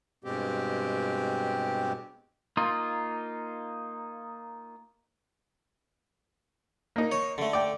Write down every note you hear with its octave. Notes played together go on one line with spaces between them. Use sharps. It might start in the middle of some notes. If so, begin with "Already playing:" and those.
G2 B2 G#3 C4 G4
A#3 D#4 F4
A#3 D#4
C#5
D3 A3
D5 G5